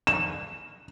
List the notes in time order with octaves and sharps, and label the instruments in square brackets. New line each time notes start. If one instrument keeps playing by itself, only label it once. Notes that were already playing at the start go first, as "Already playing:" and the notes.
[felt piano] E7